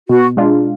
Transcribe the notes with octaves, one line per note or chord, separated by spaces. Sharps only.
B2 F#4
G#3 D4 F4